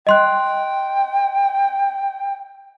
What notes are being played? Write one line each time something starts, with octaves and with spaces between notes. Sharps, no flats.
D#5 G5 C6 F#6